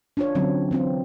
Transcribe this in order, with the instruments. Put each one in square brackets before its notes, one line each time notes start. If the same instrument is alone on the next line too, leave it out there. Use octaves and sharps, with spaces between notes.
[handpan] D4 F4 C#5
D3 F#3 C4 C#4
E3 C4 F4